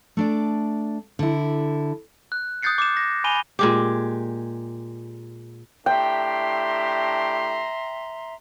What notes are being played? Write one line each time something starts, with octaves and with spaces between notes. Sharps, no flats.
A3 D4 D5
D3 E4
F#6
D#6 F#6 G6 A6 C7 C#7
D6 E7
A#6
G#5 B5 C6 D#7 F7 G7
A#2 G#3 G4
A2 D4 G4 E5 G5 A#5 C6